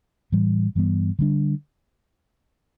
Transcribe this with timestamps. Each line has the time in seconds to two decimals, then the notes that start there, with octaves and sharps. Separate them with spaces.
0.32 A2 E3 G3
0.75 G2 E3 G3 B3
1.19 D3 G3 D4